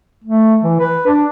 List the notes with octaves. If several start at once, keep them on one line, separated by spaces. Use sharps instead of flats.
A3
E3
B4
D4